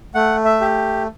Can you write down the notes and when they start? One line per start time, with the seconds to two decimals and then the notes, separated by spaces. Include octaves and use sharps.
0.15 A3 F#5
0.45 E5
0.61 G4